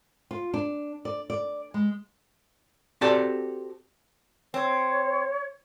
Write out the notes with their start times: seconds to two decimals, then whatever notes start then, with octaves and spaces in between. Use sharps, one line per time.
0.31 F4
0.54 D4
1.05 D5
1.30 D5
1.74 G#3
3.01 C4 F#4 G4 A4 D5 A5
4.54 C4 C#5